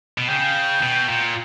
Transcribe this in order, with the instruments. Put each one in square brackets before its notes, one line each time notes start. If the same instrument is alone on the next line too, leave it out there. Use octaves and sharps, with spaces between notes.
[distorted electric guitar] B2
[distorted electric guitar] C#3 [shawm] G5
[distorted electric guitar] B2
A#2